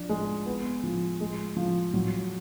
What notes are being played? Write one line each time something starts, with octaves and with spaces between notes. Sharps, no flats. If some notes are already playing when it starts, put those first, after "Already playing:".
Already playing: F3 D4
G#3
B3
F3
G#3
F3
F#3